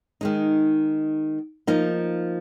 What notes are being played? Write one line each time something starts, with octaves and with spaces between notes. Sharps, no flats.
D#3 G#3 D#4
F3 A#3 D#4